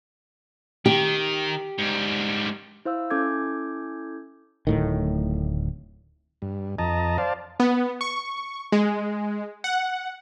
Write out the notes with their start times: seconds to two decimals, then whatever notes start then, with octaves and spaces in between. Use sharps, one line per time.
0.86 D#3 G4
1.79 G#2 G3
2.85 E4 C5 F5 E6
3.10 C#4 E4 A4 D6 G6 G#6
4.67 D1 A2 D#3
6.42 G2
6.79 F2 D#5 A5 A#5
7.18 C5 D5 F5 A5
7.60 B3
8.01 C#6
8.72 G#3
9.64 F#5